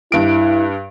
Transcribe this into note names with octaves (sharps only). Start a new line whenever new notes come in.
G2 E4 D7